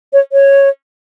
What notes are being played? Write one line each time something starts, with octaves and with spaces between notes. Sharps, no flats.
C#5
C#5